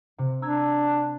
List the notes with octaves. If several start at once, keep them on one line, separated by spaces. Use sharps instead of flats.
C3
D4 A#5 E6 G#6